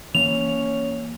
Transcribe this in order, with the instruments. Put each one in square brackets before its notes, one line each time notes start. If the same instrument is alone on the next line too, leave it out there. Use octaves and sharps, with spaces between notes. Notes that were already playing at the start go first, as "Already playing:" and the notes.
[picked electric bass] E3 A#3 [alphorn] C#4 [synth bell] F7